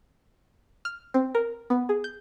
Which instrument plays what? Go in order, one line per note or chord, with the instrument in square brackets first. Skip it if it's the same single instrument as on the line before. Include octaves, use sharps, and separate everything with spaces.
[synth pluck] F6
C4
A#4
B3
G#4
G6